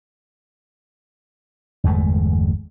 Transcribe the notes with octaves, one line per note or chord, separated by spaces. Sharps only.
G1 E2 G#3 A3